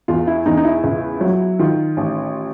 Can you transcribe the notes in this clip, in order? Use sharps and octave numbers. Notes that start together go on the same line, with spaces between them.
E2 F4
E4
E2 D#4
D#4
E4
C#2
F#3
D#3 F4
A1